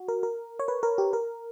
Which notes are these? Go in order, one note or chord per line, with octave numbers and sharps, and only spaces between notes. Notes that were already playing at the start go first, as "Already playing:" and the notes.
Already playing: F#4
A#4
A#4
C#5
B4
A#4
G4
A#4